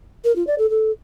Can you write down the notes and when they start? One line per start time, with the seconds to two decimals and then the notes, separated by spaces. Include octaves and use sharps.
0.24 A#4
0.36 F4
0.47 D5
0.58 A4
0.70 A4